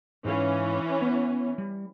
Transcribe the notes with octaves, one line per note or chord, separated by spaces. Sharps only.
G#2 E3 C#4 F5
B3
G3